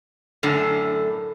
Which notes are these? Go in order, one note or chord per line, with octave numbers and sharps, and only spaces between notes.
F#2 A2 D3